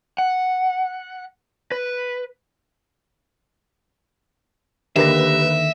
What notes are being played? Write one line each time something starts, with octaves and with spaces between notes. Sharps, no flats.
F#5
B4
D#2 D3 A#3 G4 B4 E5 A#6